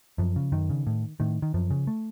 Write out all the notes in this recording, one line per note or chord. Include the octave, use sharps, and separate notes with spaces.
F#2 F3
C#3
F#2 D#3
C#3
A2
A2 D#3
D#3
F#2 F3
C#3
A3